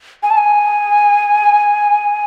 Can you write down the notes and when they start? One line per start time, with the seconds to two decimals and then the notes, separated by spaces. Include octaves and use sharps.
0.23 G#5
0.30 A5
0.37 G#5